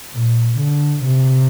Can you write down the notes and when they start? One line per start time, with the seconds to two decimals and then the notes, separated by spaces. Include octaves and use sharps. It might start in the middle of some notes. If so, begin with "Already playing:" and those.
0.13 A#2
0.58 D3
1.04 C3